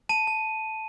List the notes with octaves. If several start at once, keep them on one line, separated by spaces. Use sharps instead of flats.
A5 D#7
A5